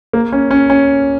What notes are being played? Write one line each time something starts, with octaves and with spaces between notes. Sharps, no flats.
A#3
C#4
C#4
C#4